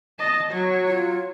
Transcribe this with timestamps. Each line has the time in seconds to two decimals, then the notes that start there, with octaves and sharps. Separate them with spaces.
0.19 D#5 A5
0.52 F#3 C#5
0.88 F4